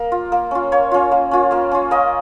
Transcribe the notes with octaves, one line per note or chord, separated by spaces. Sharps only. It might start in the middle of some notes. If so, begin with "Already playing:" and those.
Already playing: A#3 A#4
F4
A#3
C#4 F4
A#3 C#5
C#4 F4
A#3
C#4 F4
A#3 F5
C#4 F4
A#3 D#5